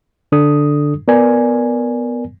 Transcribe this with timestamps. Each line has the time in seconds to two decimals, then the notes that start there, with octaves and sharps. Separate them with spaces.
0.32 D3 D4 A4 D#6
1.08 B3 A#4 D5 G#5